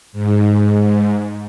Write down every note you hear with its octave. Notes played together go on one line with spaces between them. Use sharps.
G#2